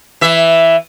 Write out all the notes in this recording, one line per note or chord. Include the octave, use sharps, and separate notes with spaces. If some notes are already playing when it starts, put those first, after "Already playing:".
E3 E5